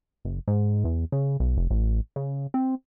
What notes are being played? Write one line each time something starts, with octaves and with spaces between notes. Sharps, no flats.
F#1
G#2
E2
C#3
B1
F1
A1
C#3
C4